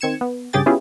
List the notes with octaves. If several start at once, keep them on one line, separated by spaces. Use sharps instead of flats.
D#3 C4 G#6 C#7 E7
B3
G2 C#3 G4 G#4 G5 A6
B3 C#4 E4 F4 G4 G#4